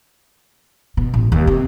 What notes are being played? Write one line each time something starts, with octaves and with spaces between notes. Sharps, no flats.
B2
A1
D#2
C3